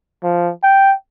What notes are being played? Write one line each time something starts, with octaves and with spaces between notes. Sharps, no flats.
F3
G5